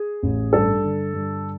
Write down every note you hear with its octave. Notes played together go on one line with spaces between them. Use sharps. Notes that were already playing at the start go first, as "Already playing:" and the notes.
Already playing: G#4
A1
G2 A4
D3
G2